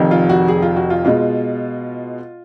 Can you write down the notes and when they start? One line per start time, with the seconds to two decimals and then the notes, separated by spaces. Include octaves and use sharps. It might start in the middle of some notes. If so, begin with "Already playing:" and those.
Already playing: F1 F2 D#3
0.11 F4
0.29 F#4
0.48 G#4
0.62 F4
0.77 F#4
0.90 F4
1.05 B2 G#3 F4